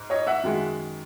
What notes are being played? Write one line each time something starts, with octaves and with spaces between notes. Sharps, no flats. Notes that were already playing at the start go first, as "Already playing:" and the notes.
Already playing: G#2
C#5 D#5
E5 F#5
F#2 D#3 G#3